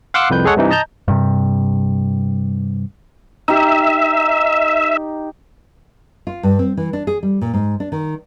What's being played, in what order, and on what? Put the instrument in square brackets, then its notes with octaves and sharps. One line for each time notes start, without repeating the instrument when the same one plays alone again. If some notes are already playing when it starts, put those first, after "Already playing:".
[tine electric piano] F5 F#5 C6 D6 E6 F#6
C2 F2 B4 G6
G#3 G#4 A4 C#5 F#5
G2 C3 E3 D#4
D#5 A5 A#5 G6
[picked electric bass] G2 C3
[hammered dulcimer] D#4 G4 [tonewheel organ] E5
[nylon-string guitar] F4
G2
C4
E3
D4
G#4
G3
A#2
G#2
D4
D#3